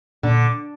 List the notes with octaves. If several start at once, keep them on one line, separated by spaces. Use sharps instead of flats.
A#2 D3